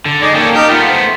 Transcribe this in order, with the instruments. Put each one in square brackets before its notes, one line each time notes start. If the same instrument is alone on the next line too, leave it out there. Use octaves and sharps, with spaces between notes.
[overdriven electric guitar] D3
[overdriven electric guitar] G#3 [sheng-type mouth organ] D#4 D5
[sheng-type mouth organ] A#3 G5 [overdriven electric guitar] C#4 A4
[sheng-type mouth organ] D#4 A#4 G6 [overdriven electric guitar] G4
[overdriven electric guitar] A3 B3 [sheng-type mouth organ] F4 G5
[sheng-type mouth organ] C5